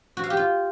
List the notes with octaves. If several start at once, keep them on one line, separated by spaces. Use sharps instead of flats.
F#4
F5
G4
F4